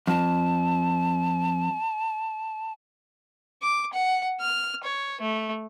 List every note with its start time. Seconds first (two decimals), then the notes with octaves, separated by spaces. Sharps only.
0.07 F2 A5
3.62 D6
3.93 F#5
4.40 F6
4.83 C#5
5.21 A3